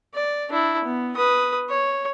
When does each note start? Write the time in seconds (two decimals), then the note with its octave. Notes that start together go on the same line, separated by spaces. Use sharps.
0.14 D5
0.49 D4 E4
0.84 B3
1.17 B4 D#6
1.69 C#5